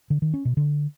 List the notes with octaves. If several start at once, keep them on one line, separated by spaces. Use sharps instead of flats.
D3
D#3
C#4
B2
D3